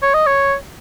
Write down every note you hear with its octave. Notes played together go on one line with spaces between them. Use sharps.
C#5
D#5
C#5